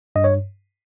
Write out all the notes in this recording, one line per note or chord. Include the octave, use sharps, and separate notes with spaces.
G2 D#5
C#5